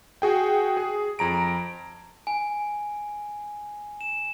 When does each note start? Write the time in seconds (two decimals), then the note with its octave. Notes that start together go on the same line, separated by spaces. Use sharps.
0.22 F#4 G#4 G5
0.77 G#4
1.19 F2 A#5 D7
2.27 G#5
4.01 E7